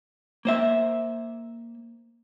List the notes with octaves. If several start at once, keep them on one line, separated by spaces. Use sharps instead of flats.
A#3 C5 E5